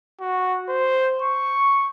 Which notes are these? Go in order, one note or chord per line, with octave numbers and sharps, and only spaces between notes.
F#4
C5
C#6